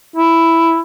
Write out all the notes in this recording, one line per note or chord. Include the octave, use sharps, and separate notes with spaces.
E4